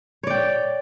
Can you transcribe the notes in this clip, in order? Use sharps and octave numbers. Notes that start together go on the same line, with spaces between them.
C#5 D5 G5